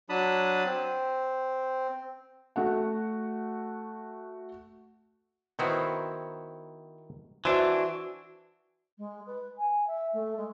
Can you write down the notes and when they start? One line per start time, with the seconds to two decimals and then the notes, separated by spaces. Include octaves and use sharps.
0.09 F#3 D4 A5 B5 D#6
0.66 C4
2.56 A3 F#4 F#5
5.59 D#3 F#3 B3 C4 E4 F#4
7.45 E3 D4 F#4 C5 E5
8.98 G#3
9.26 B4
9.57 G#5
9.86 E5
10.13 A3
10.37 G#3